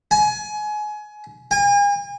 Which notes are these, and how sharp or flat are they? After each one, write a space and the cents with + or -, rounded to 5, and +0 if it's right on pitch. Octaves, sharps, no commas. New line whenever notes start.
G#5 +25
G#5 -40